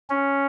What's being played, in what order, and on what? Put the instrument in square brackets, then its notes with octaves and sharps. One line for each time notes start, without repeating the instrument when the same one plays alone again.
[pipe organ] C#4